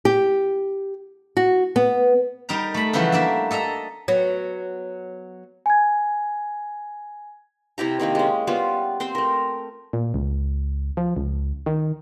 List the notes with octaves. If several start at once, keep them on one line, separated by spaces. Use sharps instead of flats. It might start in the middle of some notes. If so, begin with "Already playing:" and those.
G4
F#4
B3
G3 D#4 A#4 A#5
A3 B5
C#3 E3 F3 G3 E4 F#4
A#3 D4 E5
A4 D#5 E5 A#5
F#3 B3
G#5 G#6
C3 E4 G4 A#5
C3 D#3 A#3 C4
G#3 C#4
G3 B3 F4
C4 C5 G5 C6
A3 A#4
A#2
C#2
F3
C#2
D#3